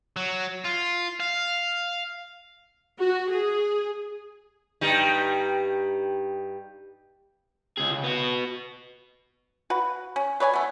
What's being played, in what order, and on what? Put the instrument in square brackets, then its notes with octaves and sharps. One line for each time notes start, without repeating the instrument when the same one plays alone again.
[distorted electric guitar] F#3
F4
F5
[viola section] F#4
G#4
[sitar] G2 G3 D#4
[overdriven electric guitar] C#2 G#4
C#2
B3 F#4
[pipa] F#4 B4
C#4
B4 C#5 D5 G#5
A3 B3